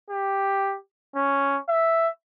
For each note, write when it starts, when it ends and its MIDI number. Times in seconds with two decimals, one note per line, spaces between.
0.10 0.76 67
1.16 1.59 61
1.69 2.09 76